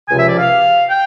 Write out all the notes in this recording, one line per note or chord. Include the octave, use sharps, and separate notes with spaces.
C#2 C3 F3 G#5
E5
D5
F5
G5